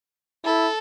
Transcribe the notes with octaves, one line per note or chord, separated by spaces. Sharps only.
E4 A4